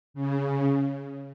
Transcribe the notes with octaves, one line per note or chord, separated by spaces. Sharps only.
C#3